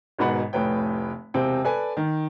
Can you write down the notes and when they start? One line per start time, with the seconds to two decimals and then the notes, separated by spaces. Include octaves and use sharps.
0.19 G#1 G#2 B2 F#5 B5
0.53 F1 A2 B4 C#5 G5
1.34 E1 C3 C4 G5
1.64 A4 B4 D5 G#5
1.97 D#3